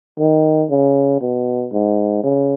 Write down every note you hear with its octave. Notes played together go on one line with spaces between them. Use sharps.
D#3
C#3
B2
G#2
C#3